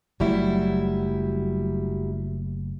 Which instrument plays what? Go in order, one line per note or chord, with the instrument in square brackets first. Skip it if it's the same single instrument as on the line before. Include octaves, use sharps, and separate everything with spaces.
[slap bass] F#1 A3 [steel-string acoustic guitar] F#3 G3 E4